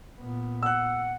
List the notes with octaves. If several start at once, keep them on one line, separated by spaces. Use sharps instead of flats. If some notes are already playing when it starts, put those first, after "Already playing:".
A#2 B3
F#5 E6 F#6